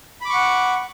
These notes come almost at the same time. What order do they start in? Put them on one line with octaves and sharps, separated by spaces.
B5 D6 C#6 F#5